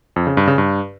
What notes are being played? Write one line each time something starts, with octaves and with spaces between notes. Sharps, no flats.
F2
C#3
G2
C#3
G2